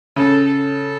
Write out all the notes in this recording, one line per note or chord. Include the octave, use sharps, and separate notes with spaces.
C#3 A4
A4